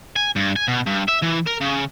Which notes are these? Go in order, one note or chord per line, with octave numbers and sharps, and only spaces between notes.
G#5
G2
G#5
B2
G2
E5
E3
A#4
C#3